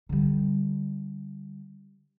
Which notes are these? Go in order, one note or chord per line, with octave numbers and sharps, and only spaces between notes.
D3 G3